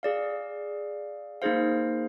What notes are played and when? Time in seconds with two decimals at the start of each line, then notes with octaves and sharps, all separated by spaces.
0.03 G#4 D5 F5
1.42 A#3 D#4 G#4 C5 F5